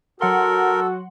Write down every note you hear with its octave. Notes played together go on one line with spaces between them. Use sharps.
F#3 F#4 A4 A#4 F#5 C6